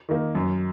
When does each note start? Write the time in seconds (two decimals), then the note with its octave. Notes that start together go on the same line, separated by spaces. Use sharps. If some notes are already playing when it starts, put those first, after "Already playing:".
0.09 D#3 A#3
0.35 F#2